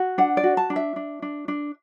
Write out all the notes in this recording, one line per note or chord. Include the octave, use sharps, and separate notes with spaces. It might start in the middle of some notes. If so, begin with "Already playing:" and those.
Already playing: F#4
D4 F#5
D5
F#4
A5
D4
E5
D4
D4
D4